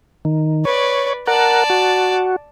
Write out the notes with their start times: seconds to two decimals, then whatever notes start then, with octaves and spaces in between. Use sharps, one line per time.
0.25 D#3
0.65 B4 C#5 D5
1.27 A#4 D5 F#5 A5
1.70 F#4